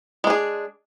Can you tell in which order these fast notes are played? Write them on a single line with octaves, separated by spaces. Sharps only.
G#3 D4 G#4